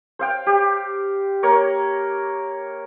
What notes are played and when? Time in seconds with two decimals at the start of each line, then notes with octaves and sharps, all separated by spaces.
0.19 C5 F5 G5
0.46 G4
1.43 A#3 A#4 C#5